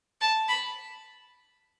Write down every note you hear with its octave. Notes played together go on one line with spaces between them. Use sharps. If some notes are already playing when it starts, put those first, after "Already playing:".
A5
B5